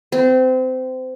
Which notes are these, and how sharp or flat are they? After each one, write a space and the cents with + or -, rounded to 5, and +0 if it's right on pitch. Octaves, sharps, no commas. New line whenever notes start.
C4 -25